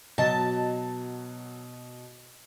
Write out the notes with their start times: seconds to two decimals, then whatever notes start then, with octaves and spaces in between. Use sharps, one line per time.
0.18 B2 F#3 F#4 D#5 A5